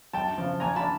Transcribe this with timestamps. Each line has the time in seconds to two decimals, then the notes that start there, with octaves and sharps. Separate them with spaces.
0.13 F#2 G5 A5
0.38 C#3 F3
0.60 A#1 G#5 A#5
0.76 A5 B5